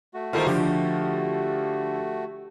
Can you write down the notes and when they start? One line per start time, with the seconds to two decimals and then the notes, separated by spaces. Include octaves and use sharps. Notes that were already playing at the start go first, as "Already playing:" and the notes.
0.14 A3 F#4
0.33 D#3 G3 A#3 F4 A4 C5
0.46 D3 F3 G4